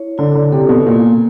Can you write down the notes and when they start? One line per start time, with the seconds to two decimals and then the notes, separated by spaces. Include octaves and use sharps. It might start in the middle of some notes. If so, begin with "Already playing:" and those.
Already playing: E4 C#5
0.18 D3 E4
0.35 D3
0.52 C3 A4
0.69 B2
0.87 A#2 A#3